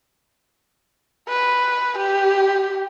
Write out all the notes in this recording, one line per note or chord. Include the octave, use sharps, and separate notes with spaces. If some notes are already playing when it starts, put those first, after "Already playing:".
B4
G4